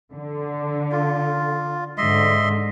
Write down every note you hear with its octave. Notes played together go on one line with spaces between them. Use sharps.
D3
F4
G#2 D3 D#5 E5 C6